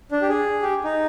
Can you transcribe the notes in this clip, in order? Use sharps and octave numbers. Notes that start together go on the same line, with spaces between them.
D4
G4
G#4
G4
D#4